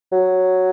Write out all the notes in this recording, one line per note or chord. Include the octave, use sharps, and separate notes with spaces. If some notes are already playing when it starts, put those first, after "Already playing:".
F#3